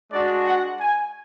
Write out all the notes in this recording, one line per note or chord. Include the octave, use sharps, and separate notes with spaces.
G#3 D4 F#4 D5
F#5
G#5